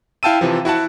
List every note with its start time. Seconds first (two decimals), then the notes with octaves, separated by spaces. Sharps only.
0.23 E4 F5 G5 A5 E6 D#7
0.41 C3 E3 F3
0.65 E4 F#4 F#5 A5